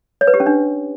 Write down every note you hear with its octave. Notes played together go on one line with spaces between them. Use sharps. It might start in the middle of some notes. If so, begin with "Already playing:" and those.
C#5
B4
G4
C#4
D4